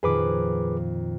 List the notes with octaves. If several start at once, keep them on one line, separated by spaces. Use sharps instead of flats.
F2 A#2 D#3 G#4 B4 D6